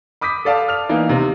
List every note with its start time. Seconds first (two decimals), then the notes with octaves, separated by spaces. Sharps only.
0.21 B5 D6 D#6 G6 B6
0.45 A4 D5 F5 A5 D6
0.68 F6 F7
0.89 E3 A#3 B3 D#4
1.09 C3 D#3